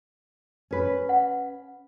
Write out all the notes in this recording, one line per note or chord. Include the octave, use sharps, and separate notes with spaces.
C#4 B4
F#5